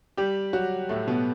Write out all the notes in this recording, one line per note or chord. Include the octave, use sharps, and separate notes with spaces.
G3 G4
F#3 F#4
A2 A3
B2 B3